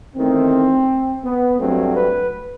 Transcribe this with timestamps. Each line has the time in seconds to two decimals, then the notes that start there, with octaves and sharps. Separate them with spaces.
0.16 E2 D#3 A3 C4
1.24 B3
1.59 G2 F#3 A3 C4
1.96 B4